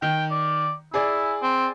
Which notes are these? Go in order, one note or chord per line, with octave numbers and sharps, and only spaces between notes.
D#3 G5
D5
E4 G#4 D5 G#5
C4